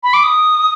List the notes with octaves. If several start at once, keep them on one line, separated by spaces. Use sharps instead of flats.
B5
D6
D#6